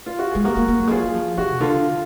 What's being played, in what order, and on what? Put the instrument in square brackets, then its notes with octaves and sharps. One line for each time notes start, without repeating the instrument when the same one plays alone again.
[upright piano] F4
F#4
[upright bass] G#3 [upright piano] G#4
[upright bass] A#3 [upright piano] F#4 A#4
[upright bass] A#3
A#3
F#3
G#3
[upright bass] F#3 [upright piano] F4 G#4
[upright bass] F3
[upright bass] F3 [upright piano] F#4
[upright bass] B2
[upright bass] D3 [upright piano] F4